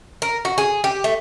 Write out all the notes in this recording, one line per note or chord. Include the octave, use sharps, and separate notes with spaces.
A#4
F#4
G#4
G4
A3